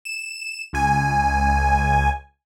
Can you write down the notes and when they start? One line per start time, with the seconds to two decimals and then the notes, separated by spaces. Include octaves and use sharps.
0.05 E7
0.73 C#2 G#5